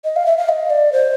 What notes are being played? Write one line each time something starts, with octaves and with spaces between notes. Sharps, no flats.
D#5
F5
E5
F5
D#5
D5
C5